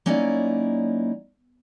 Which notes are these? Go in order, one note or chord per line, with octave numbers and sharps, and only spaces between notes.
F#3 A#3 C#4 D#4 E4 D5